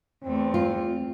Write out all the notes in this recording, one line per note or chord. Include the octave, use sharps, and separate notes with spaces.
E2 A3 C4
F4